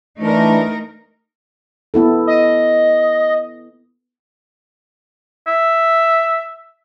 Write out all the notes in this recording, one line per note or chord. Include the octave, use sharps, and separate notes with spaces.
E3 A3 D4 D#4 A#4
B3 E4 A4
D#5
E5